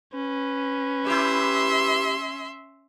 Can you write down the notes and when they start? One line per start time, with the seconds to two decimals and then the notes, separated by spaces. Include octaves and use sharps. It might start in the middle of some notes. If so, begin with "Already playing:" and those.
0.14 C#4 B4
1.06 E4 G4 E5 C6